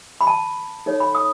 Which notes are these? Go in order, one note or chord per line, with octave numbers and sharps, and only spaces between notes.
B5
A5
D#4 A4 C#5
B5
D#6